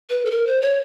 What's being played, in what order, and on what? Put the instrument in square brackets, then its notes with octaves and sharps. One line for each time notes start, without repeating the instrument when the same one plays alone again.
[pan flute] B4
A4
A#4
C5
C#5